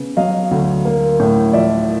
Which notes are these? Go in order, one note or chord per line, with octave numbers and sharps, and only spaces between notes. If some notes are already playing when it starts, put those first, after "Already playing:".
Already playing: C#3 B3
F#3 D#5 F5
D2
A#3
A2
F3 D5 E5